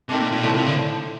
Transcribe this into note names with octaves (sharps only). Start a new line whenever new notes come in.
C3 D#3 A3 D4
A#2
A#2
A2 C3 F3 A3
C3
D3